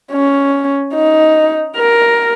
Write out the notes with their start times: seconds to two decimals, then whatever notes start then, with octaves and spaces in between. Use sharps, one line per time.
0.12 C#4
0.95 D#4
1.77 A#4